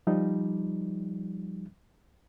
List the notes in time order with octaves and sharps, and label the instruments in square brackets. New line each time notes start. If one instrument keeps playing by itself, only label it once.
[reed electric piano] F3 G3 D#4